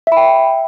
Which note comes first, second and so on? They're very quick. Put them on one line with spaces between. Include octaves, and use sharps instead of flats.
E5 B5 G5